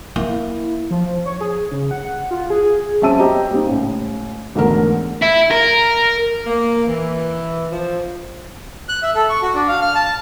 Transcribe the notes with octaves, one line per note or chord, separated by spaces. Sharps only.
A#3 E4
F3
C#5
G#4
C#3
F#5
F4
G#4
F#2 C4 E5 A5 E6 D#7
C4 G4 D#5 G5 A#5
G3 A#3 C4 D#4
C#2 A2
E1 G#2 D3 A3 B3 A#4
E4
A#4
A#3
E3
F3
F#6
E5
A4
C#6
F#4
D4
F5
F6
A5